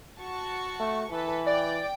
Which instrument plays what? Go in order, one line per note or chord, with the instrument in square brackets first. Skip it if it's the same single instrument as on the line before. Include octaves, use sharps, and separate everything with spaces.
[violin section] F#4 A5 C#6
[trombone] A3
[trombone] E3 [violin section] A4 B4
[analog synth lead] D5 [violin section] G5